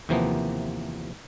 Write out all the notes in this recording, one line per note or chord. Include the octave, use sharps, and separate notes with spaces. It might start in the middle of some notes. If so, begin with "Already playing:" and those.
D#2 C3 E3 F3 A#3 B3